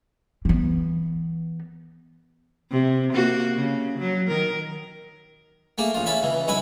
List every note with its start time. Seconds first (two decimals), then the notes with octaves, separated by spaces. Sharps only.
0.45 E3 B3
2.71 C3
3.12 A#3 F#4
3.56 C#3
3.98 F#3
4.28 D#3 A#4
5.78 A3 A#3 G#4
5.94 A1 F4
6.06 C#4 E4 A5 B5
6.22 C#2 E3
6.48 B1 G#3 E4 G#5 B5